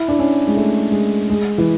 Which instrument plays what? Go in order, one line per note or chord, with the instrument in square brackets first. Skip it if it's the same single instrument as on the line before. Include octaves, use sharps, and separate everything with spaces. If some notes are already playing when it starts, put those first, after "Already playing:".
Already playing: [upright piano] E4
D4
C#4
G#3
A3
G#3
G#3
E3